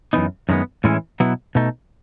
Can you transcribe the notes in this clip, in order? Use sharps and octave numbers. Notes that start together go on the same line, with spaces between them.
F#2 E3 B3 D#4
F#2 D#3 G#3 B3
A2 E3 G#3 C#4 E4
B2 F#3 B3 E4
B2 A3 D#4